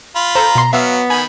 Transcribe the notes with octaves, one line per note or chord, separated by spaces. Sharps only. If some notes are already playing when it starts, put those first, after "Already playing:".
F4 B5
A4 C5 A#5
B2 C6
F#3 B3 E5 F5
D#3 G#5 B5